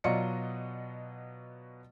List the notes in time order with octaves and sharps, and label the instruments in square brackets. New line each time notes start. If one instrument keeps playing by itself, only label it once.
[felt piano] B2 F#3 F4 D5 D#5 C#7